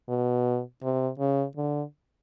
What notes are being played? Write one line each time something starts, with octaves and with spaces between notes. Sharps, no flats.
B2
C3
C#3
D3